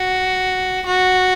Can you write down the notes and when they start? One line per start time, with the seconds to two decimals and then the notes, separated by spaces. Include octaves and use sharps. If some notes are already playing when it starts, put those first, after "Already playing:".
Already playing: F#4
0.86 F#4